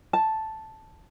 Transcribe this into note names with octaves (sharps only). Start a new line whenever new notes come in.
A5